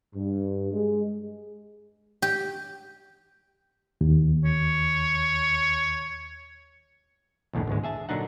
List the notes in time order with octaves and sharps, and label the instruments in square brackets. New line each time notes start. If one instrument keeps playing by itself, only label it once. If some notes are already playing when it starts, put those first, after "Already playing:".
[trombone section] G2
G#3
[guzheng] G4
[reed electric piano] D#2
[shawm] C#5
[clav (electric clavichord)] B1 E2 A2 D3
G#1 D2 G#3
G#4 E5 A5
A#2 D3 F#3 D4 D#4 F#5